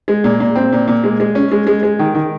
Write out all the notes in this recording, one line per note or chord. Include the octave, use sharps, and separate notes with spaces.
G#3
A#2
A#2
C4
A#2
A#2
G#3
G#3
C#4
G#3
G#3
G#3
D#3
D#3